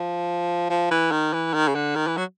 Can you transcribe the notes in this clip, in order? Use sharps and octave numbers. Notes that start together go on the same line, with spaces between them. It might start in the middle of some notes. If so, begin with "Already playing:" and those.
Already playing: F3
F3
E3
D#3
E3
D#3
C#3
D3
D#3
E3
F#3